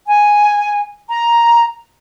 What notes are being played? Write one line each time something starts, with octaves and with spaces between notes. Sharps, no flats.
G#5
A#5